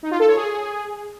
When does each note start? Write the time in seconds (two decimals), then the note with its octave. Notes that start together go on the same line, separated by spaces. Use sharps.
0.03 D#4
0.11 F4
0.20 A4
0.28 C#5
0.36 G#4